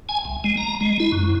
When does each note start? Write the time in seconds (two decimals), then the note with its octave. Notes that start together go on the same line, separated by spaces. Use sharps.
0.09 G#5
0.25 C2
0.44 G#3
0.57 A#5
0.81 G#3
1.00 E4
1.12 F#2